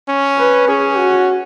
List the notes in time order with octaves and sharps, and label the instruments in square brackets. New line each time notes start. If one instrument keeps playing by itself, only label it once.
[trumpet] C#4
[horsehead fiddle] B4
[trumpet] C#4 [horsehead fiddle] G#4
[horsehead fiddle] F#4